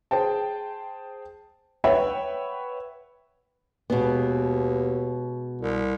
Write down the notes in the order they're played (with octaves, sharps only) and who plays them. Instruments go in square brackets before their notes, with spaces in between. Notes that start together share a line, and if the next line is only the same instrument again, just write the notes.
[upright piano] G#4 C5 G5 A5
B4 C#5 E5 F#5 G5 B5
[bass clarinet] D#2 [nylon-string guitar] B2 G#3 B3
[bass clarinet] C2